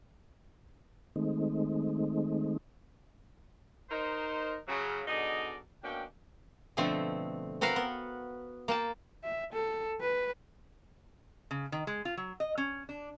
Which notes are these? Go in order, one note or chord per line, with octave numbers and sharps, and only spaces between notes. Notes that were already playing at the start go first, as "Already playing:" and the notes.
D#3 G#3 A3 C4 D#4
D#4 A#4 C5
C#3 F#3
B2 D3 D#4 G#4 D5 D#5
B2 A#3 C#4 D4 G5
B2 D3 F3 A3 C4
C4 F#4 A#4 B4 F5
B3
A#3 G5 A5
E5
A4
B4
C#3
D#3
G#3
F4
F#3
D#5
C#4
D4